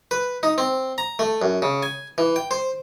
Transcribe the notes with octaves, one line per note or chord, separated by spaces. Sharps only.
B4
D#4
C4
A#5
A3
F#2
C#3
G#5
E3
G5
C5